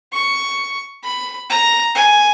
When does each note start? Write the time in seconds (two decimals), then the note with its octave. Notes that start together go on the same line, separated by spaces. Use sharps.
0.13 C#6
1.04 B5
1.50 A#5
1.95 G#5